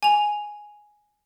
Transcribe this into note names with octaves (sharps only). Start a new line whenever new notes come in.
G#5 F7